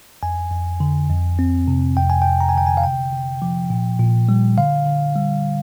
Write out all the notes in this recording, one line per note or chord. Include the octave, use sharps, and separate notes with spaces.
F2 G#5
F2
D3
F2
C4
C3
F2 G5
G#5
F2 G5
A#5
G#5
D3 G5
G#5
F5
C3 G5
C3
F3
A#2
A#2
G3
D3 F5
D3
G3